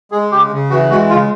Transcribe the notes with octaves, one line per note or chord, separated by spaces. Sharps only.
G#3 G#4
C#3 G4
C#3
E3 F#4
G#3 F#4
C#3 F4